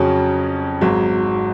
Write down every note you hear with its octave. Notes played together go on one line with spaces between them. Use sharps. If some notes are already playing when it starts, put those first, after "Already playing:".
Already playing: F2 C#3 F#3 C#4
G#1 G#2 F#3